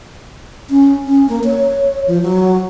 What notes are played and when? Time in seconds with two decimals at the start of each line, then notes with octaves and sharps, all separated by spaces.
0.70 C#4
1.05 C#4
1.29 A#3
1.44 C#5
2.07 F3
2.22 F#3